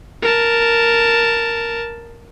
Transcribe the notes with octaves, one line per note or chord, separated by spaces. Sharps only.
A#4 A5